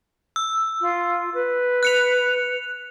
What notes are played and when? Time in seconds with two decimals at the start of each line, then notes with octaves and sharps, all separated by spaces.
0.36 E6
0.81 F4
1.34 B4
1.83 F#6 C#7 F7